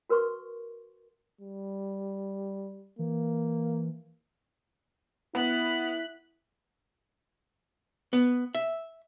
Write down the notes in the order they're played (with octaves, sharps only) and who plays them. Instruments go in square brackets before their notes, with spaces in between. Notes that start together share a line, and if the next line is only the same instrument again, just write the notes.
[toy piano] F#4 A#4 B4 C6 C#6
[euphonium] G3
[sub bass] E3 [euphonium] A#3
[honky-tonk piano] B3 [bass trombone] E4 [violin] F#6 B6
[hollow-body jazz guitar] B3
E5